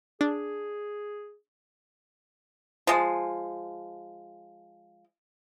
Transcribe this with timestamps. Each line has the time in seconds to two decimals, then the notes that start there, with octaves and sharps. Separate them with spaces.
0.21 D4 G#4
2.87 F3 G#3